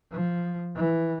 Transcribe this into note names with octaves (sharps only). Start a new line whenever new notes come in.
F3
E3